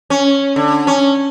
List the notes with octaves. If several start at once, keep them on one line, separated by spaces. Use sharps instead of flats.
C#4
D3
C#4